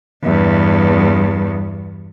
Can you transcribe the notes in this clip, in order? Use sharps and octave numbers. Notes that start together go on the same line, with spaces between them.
E2 G2